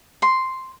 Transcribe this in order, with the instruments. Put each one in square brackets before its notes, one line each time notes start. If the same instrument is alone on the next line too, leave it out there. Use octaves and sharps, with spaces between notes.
[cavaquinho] C6